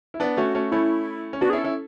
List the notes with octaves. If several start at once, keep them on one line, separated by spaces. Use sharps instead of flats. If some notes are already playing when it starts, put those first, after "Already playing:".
E4
B3 D4
A3 C#4 F#4
A3 C#4
A3 C#4 E4
C#4
B3 D4 F#4
G#4
C#4 E4
A4
C#4 E4